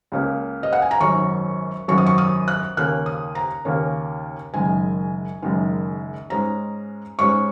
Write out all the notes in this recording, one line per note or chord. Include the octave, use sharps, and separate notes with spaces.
C#2 C#3 A#3
D#5
F#5
G#5
A#5
G#1 F#2 F#3 C#4 C#6
G#1 F#2 F#3 C#4 C#6
D#6
C#6
D#6
F#6
D#2 C#3 A#3 C#4 F#6
D#6
A#5
D#2 C#3 A#3 C#4
F#1 F#2 D#3 G#3 G#5
F#1 F#2 D#3 G#3
G#2 G#3 C#4 A#5
G#2 G#3 C#4 C#6